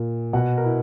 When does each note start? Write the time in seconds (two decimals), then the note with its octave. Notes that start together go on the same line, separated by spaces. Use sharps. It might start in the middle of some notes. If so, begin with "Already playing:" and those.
Already playing: A#2
0.33 B2 F#5
0.57 A#4
0.64 E4